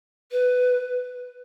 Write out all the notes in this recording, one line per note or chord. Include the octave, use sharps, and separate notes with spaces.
B4